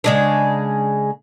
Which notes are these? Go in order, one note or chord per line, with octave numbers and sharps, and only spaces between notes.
C#3 G#3 D4